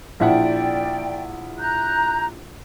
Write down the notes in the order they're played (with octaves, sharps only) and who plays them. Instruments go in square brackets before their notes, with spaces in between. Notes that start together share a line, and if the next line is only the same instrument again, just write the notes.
[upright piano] A#1 E4 F#5 [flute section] D5 G5
[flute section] A#5 F#6 G6